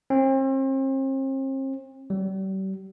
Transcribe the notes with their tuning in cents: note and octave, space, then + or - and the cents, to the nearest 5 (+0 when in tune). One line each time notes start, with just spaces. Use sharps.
C4 +40
G3 -40